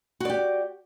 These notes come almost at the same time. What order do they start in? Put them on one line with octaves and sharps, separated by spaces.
F#4 D5 G4